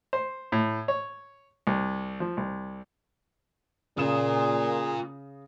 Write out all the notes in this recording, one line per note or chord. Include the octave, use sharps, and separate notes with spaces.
C5
A2
C#5
C2
F3
C2
A#2 C#3 F4 G#4 A#4 D#6 E7